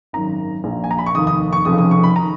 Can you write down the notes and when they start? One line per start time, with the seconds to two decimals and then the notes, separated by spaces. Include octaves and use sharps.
0.13 G#1 F#2 D#3 A#5
0.64 A#1 A#2
0.84 G#5
0.91 A#5
0.99 B5
1.06 C#6
1.15 F1 D#2 D#3 D#6
1.27 D#6
1.53 C#6
1.65 F1 F2 C#3 D#6
1.78 D#6
1.91 C#6
2.03 B5
2.16 D#3 A#5